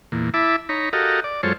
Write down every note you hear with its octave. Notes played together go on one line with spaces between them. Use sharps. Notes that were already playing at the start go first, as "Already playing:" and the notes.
E2 A#2
E4 E5 A5 B5 D6
D#4 C#5 A#5 B5
F#4 G4 A4 A#4 D#5 F5
D5
F#2 G#3 F4 A4 C5 C#5